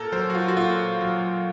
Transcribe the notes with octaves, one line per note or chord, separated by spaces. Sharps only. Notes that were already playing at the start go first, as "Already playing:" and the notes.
Already playing: A#2 A4 A#4
F#3 C5
F#4
F4
F#4
A#2 F4
F#3